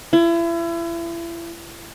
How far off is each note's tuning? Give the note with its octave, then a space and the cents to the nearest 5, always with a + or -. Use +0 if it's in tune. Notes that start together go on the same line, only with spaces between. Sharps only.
E4 +35